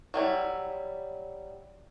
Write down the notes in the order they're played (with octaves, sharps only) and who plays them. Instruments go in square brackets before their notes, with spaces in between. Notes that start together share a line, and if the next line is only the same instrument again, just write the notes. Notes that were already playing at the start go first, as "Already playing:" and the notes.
[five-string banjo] F#3 G3 E4